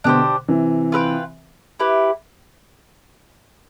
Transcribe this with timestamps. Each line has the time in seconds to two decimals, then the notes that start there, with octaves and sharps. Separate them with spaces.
0.04 B2 D3 D4 G4 C5
0.48 C3 E3
0.92 F4 B4 E5 G5
1.80 E4 G4 B4